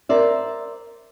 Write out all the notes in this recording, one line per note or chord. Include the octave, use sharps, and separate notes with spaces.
A#4 C5 D5 E5